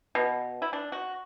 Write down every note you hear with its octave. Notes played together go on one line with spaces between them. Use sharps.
B2
E4
D4
F#4